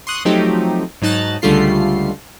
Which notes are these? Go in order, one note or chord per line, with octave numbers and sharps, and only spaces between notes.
C6 C#6 D#6 F#6
F3 F#3 A3 C4 D#4 G4
G#2 F#3 D#4 A5 F#6 A6
C#2 D3 G3 A3 F4 C7